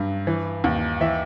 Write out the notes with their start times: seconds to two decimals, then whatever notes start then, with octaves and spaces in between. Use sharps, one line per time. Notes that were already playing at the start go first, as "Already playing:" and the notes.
Already playing: G2 F#3
0.27 E3
0.64 D#2
1.01 E3 E5